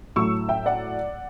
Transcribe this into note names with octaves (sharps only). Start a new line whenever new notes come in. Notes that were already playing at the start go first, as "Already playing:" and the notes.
A2 F#3 A3 C#6 E6
E5 G5
D5 F#5